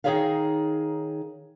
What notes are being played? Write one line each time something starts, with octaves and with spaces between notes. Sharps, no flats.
D#3 D#4 G#4 C#5 E5 F5